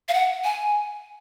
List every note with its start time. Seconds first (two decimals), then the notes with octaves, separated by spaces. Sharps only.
0.09 F5
0.14 F#5
0.44 G#5